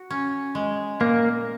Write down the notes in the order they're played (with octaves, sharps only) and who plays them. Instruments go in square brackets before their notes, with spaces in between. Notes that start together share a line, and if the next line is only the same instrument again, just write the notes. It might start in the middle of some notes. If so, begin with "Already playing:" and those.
Already playing: [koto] F#4
C#4
G#3
[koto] A#2 [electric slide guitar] A#3